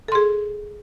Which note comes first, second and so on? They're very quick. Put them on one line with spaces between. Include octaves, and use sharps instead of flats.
A4 C6 G#4